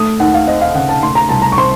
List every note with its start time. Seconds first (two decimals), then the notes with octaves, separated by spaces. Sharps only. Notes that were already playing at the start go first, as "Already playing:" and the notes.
Already playing: A3 D#6
0.20 D#2 F#5
0.34 F5
0.47 C4 D#5
0.61 F5
0.75 C#3 F#5
0.89 A5
1.03 A3 C6
1.15 A#5
1.29 C2 A5
1.42 A#5
1.52 C#6
1.57 C4 C6